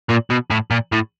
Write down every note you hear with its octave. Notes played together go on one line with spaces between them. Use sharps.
A#2
B2
A2
A#2
A2